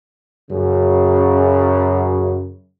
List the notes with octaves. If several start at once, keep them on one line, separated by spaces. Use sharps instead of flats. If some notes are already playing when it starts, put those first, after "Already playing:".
F#2 C#3